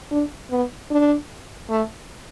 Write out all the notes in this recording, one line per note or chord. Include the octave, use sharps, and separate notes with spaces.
D4
B3
D4
A3